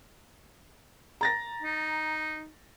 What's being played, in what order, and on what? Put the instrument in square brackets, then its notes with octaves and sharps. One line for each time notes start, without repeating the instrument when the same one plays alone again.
[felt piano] A#5 A6 A#6
[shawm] D#4